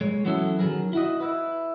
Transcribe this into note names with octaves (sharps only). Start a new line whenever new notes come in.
G#3 C#5
E3 F#3 B3 C#4 E4 A4
D#3 F#3 G#4 A#4
E4 F#4 D#5
E4 B4